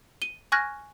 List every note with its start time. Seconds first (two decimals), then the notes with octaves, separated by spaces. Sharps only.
0.22 D#7 G7
0.52 G#5 C#6 F6 F#6 G#6 A#6